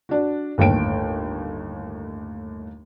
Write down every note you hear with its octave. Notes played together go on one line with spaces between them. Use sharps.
D4 F#4
G1 D#2 A2 G5 D7